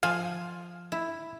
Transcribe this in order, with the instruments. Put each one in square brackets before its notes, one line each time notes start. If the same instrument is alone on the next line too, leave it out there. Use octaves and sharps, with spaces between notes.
[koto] F3 G#5 [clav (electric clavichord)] F5
[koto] E4